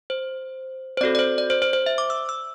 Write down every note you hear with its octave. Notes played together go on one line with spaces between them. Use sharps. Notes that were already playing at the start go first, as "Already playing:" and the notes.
C5
C5
C4 F#4 A4 D5
D5
C5
D5
C5
C5
C5
E5
D6
E6
E6